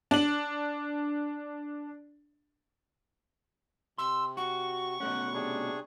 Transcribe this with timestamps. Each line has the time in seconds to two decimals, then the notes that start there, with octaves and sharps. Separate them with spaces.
0.11 D4 F#7
3.98 C3 C6 E6
4.37 F#4 C#6
5.00 B2 A3 C#4 F#5
5.34 C3 D4 G#4